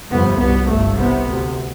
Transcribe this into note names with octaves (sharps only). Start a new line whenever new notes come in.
G1 F2 C3 B3
C2 B2 B3
G1 G2 A3
C2 C3 B3
D2 C3